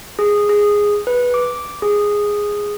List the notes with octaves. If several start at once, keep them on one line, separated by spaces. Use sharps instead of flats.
G#4
G#4
B4
D6
G#4